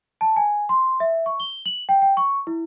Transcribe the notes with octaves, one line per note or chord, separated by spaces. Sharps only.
A5
G#5
C6
E5
C#6
G7
F#7
G5
G5
C#6
E4